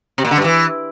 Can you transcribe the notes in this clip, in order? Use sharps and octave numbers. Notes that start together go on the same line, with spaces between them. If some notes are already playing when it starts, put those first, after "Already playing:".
C3
A#2
D3
G2
E3